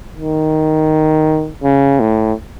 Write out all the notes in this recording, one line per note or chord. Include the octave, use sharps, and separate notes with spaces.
D#3
C#3
A2